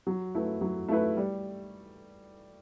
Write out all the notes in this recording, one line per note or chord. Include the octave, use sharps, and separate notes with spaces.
F#3
A3 E4 B4
F#3
A3 E4 B4
G3